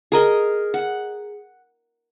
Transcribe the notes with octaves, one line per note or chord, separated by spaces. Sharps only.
G#4 A#4 D#5
F#5